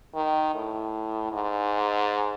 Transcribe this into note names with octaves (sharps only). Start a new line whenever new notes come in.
D#3
A2
G#2